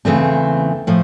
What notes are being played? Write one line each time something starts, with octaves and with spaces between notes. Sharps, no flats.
E2 C#3 E3 A3 C4
A2 F3